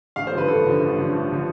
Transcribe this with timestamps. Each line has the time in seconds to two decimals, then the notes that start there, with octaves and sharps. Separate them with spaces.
0.16 A1 F5
0.27 C5
0.32 G2 D3 F3
0.38 B4
0.48 A1 A4
0.64 G2 D3 F3
0.80 A1
0.96 G2 D3 F3
1.12 A1
1.30 D3 F3